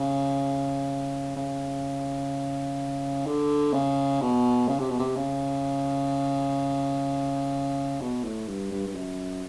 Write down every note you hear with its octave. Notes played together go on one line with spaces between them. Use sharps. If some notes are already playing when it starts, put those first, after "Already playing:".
Already playing: C#3
C#3
D3
C#3
B2
C#3
C3
B2
C3
C#3
B2
A2
G2
G2
G2
F#2